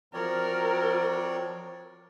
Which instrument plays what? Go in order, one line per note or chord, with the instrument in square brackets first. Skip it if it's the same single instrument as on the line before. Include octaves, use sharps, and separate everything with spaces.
[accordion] F3 [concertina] C4 C#5 D5 [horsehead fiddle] F#4 A#4